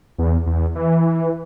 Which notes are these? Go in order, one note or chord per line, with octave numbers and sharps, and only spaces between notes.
E2
E2
E3